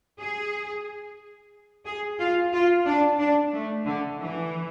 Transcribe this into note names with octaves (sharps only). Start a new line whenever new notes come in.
G#4
G#4
F4
F4
D4
D4
A3
D3
E3